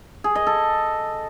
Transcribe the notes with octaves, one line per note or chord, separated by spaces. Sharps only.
G#4
D#5
A4